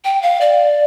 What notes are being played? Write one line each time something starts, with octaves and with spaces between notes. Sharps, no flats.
G5
F5
D5